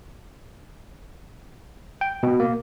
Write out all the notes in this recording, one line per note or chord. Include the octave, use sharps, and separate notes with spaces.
G5
B2
A#3